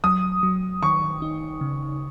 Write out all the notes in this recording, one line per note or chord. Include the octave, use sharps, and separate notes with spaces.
F#3 D#6
F#3
D#3 C#6
D#4
C#3